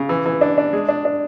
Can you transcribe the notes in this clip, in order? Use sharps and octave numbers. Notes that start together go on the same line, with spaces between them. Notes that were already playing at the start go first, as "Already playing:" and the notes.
Already playing: C#3
E3
E3
D4
D4
G#3
D4
D4